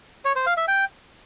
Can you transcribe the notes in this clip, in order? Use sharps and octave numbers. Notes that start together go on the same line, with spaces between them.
C#5
C5
F5
E5
G5